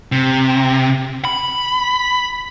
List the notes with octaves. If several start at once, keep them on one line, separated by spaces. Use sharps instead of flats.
C3
B5